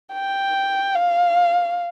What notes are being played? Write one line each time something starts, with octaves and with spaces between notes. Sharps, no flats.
G5
F5